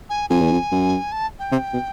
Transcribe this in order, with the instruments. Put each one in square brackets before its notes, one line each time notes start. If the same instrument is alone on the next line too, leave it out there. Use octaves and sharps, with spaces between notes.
[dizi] G#5
[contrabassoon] F2 [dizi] G#5
[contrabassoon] E2
F2
F#2
[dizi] A5
G5
[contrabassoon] C3
B2